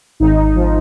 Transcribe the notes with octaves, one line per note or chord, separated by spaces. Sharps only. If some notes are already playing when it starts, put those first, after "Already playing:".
G#1 D#4
F3